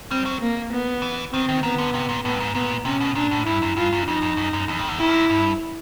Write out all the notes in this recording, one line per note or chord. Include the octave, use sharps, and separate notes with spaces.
G3 C4
F#3
A#3
B3
E3
D#3 C4
D#3
D#3 B3
D3
C3
A#2
A2 B3
G2
G#2
A#2 B3
C3 C#4
B2
A#2 D4
A2
G2 E4
F#2
G2 F4
F#2
F2 D#4
F2
F#2
F#2
E2
F2
E2
F2 E4
G2
F#2
G2